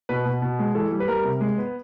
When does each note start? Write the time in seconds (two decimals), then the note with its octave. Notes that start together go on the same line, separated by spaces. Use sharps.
0.09 B2 B4
0.25 B2
0.42 B2
0.59 G#3
0.75 E3 A4
0.92 G3
1.00 B4
1.08 G3 A#4
1.24 C3
1.41 G#3
1.58 B3